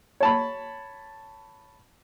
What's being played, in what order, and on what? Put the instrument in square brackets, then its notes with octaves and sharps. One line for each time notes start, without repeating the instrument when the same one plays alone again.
[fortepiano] C#5 A5 B5